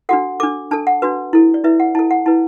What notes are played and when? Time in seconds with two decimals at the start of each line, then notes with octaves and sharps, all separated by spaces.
0.09 D4 F#4 A4 F#5
0.40 D4 A4 D6
0.71 D4 A4 A5
0.87 F#5
1.02 D4 F#4 B4
1.33 E4 A4
1.54 D5
1.64 E4 B4 E5
1.80 F#5
1.95 E4 A5
1.99 A4
2.11 F#5
2.26 E4 B4 A5